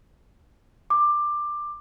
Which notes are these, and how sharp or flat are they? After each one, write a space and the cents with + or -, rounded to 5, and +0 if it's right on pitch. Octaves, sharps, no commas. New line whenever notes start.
D6 +15